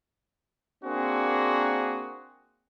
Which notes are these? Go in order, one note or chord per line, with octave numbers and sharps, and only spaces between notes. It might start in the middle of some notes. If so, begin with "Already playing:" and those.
A#3 C4 D4 F#4 G#4